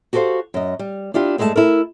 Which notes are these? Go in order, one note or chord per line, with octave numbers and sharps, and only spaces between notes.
F#4 G4 A4 A#4 C5 F5
F#2 D#5
G3
D4 E4 F4 G4
G2 G#3 A3 A4 A5
E4 A4 A#4